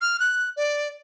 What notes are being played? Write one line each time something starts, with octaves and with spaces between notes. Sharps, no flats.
F6
F#6
D5